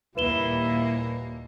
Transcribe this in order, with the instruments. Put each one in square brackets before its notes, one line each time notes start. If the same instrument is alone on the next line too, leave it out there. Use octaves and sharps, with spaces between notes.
[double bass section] D#2 A#2 [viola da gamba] G3 A#3 [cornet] E4 [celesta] B4 E7 G7